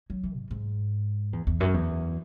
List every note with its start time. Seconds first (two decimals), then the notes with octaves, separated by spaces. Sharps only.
0.10 F#3
0.23 E3
0.37 G#2
0.51 G#2
1.33 E2
1.47 E2
1.60 F#2
1.74 E2